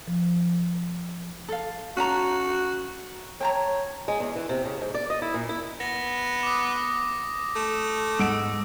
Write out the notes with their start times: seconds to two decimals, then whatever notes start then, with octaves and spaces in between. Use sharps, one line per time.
0.08 F3
1.49 A4 F5
1.97 C#4 F#4 A5 A#5
3.41 C#5 G5 A5 A#5
4.08 G#3
4.20 E2
4.36 E3
4.49 C3
4.65 C#3
4.81 G#2
4.94 D5
5.10 D#5
5.22 E4
5.34 A#2
5.49 E4
5.80 B3 A#6
6.43 D6 D#6
7.55 A3
8.19 G#2 F#5 E6 D7